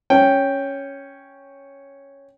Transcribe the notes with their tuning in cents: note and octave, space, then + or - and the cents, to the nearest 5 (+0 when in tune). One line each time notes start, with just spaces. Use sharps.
C#4 +0 G5 +0